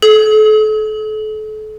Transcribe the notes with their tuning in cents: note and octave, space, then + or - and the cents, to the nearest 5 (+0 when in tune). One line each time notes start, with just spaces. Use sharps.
A4 -35